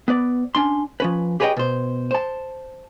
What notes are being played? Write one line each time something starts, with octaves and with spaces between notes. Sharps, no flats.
B3 B4 D5
C#4 D4 C6
F3 C#4 B4
G4 G#4 B4 C#5 D#5 G5
B2 C5
C5 A5